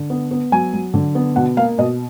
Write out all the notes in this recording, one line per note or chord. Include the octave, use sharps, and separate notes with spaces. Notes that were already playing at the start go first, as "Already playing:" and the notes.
Already playing: D3
B3
B3
F#3 G#5
F#3
D3
B3
B2 F#5
A#3 F5
B2 D#5